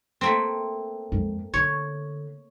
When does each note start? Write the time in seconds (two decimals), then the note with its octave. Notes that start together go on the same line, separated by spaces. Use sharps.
0.21 A3 A#3 C4
1.12 F2 G#3
1.54 D3 C#5